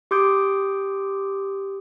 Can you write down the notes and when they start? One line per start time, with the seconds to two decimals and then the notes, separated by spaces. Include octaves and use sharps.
0.11 G4 C6 D6 D#6 G6 D7